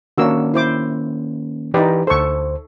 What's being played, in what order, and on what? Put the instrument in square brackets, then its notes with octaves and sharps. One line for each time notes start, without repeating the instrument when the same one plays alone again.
[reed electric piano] D#3 A#3 C#4 [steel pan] D4 F#4 E6
[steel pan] E4 C5 D6
[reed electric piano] E3 G4 B4 [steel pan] D#4 D5
[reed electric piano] D2 C5 [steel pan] A4 C#6